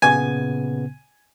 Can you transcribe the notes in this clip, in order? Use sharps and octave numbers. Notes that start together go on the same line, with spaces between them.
A#2 C#3 B3 G#5